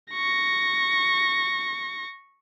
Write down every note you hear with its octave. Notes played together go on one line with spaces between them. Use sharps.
C#6 A#6